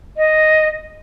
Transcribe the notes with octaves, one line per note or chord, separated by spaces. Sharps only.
D#5